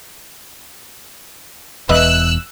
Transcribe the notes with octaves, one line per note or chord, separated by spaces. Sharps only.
E1 E2 B4 D#5 E5 E6 F#6